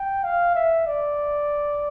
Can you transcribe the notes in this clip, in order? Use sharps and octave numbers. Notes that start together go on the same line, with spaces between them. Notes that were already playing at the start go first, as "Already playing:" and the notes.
Already playing: G5
F5
E5
D5